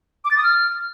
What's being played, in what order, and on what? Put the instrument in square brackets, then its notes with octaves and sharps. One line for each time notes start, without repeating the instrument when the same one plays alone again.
[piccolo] D6
A6
D#6
F6